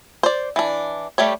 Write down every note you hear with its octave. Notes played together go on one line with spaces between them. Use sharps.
C5 D5
E3 D4
G3 A3 G4 C#5